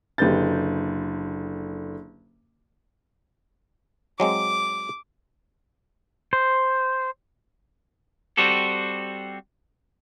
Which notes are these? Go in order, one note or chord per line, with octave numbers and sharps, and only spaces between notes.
F#1 D3 G4 B4 G6 A6
F#3 G#3 C4 D6
C5
G3 C4 F#4 G4 A4